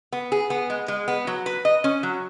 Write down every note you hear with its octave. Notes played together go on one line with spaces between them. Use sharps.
B3
G#4
B3
G#3
G#3
B3
F#3
B4
D#5
C#4
F#3